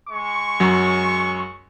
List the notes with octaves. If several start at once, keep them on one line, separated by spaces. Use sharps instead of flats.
G#3 C#6
F#2 F#3